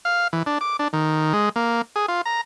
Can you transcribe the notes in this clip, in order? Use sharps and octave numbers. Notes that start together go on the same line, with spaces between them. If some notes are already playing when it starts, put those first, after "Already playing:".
F5
E3
D4
D6
D4
D#3
G#3
A#3
G#4
F4
A#5